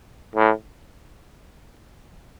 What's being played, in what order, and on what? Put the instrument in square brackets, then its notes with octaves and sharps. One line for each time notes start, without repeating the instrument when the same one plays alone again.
[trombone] A2